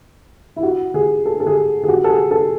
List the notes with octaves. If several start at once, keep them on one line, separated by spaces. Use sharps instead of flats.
E4
F#4
G#4
A4
A4
G#4
G#4
F#4
A4
G#4
A4